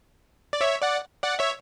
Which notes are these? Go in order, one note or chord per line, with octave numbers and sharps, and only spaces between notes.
D5
C#5 E5
D5 F#5
D5 F#5
C#5 E5